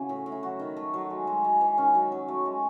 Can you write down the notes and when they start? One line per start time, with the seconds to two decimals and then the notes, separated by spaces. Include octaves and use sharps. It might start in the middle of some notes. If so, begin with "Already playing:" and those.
Already playing: C#3 E3 F#4
0.09 A2
0.26 A2
0.32 E4
0.43 F#3 F#4
0.59 D#3
0.77 A3
0.94 F#3
1.10 G#3
1.27 G#3
1.44 G#3
1.61 E3
1.78 D#3 C#4
1.95 F#3
2.12 F#3
2.28 A3
2.46 G#3